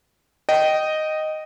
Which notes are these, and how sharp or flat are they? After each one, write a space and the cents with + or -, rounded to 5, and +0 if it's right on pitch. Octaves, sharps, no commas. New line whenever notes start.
D#5 -5 G5 -20